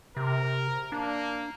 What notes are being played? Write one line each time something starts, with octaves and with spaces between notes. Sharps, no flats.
C3 A#4
A#3 D4